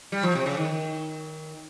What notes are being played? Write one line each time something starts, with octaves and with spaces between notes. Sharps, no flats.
G3
F3
C3
C#3
D#3